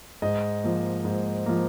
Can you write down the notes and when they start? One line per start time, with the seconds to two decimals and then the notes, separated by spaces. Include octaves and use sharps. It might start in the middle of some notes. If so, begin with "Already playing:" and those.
0.22 G#2 D#5
0.64 F3 A#3
1.05 G#2
1.46 F3 A#3